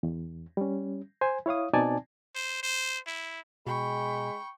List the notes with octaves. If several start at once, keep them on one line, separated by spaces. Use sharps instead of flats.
E2
G3 C#4
C5 G#5
E4 C#5 F5 D#6
B2 C4 D#4 D5 G#5 A5
C5
C5
E4
B2 G#3 G5 B5 C#6